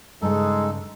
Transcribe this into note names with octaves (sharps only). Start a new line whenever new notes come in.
G2 C#3 G#3 D#4 A4